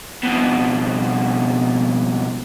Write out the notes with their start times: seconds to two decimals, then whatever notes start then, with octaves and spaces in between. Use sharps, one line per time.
0.24 F2 B2